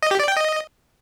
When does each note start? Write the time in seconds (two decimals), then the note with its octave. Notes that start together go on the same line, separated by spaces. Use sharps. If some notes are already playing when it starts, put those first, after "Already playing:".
0.03 D#5
0.11 G4
0.20 D5
0.28 G5
0.37 D#5